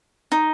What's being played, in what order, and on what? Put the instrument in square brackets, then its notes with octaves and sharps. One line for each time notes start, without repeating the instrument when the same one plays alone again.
[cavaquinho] D#4